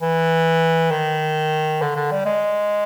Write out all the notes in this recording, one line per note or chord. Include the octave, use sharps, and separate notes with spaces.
E3
D#3
D3
D3
G3
G#3